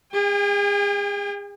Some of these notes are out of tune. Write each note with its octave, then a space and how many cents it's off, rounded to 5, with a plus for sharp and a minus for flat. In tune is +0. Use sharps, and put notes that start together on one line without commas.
G#4 -35 G5 +35